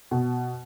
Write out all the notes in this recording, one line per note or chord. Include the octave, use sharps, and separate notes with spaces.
B2